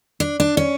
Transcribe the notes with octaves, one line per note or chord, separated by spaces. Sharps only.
D4
D4
C#4